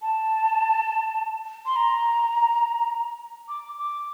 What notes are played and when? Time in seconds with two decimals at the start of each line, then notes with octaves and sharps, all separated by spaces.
0.02 A5
1.66 C6
1.76 A#5
3.49 D6
3.79 D6